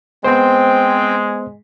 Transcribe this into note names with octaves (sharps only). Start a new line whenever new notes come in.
G#3 B3 C4 C5 G5